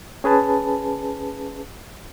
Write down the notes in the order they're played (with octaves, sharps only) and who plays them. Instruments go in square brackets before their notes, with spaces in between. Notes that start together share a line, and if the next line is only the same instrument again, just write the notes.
[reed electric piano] C#4 G#4 B4 A5